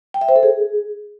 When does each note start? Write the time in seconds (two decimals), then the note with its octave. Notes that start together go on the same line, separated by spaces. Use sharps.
0.14 G5
0.21 E5
0.29 C5
0.36 A4
0.43 G#4